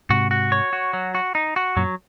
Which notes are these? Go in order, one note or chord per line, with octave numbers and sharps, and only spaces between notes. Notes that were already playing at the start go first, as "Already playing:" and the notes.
G#2 C3 F#4
F#4
C#5
F#4
F#3
F#4
D#4
F#4
F#2 A#2 F#3